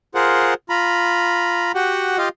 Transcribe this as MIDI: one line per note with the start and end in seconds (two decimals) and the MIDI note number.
0.15 0.54 65
0.15 0.54 68
0.15 0.54 70
0.15 0.54 72
0.15 0.54 78
0.69 1.72 65
0.69 1.72 82
0.69 1.72 83
1.75 2.18 66
1.75 2.18 67
1.75 2.18 78
2.18 2.29 65
2.18 2.29 67
2.18 2.29 75
2.18 2.29 77